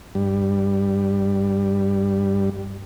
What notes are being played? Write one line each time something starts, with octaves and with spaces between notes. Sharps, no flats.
G2 G3